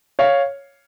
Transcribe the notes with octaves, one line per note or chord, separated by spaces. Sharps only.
C#5 F5